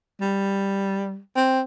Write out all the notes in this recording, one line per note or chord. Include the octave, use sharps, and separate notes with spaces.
G3
C4